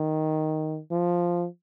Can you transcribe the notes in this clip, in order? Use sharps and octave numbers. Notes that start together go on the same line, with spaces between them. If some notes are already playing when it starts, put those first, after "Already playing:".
Already playing: D#3
F3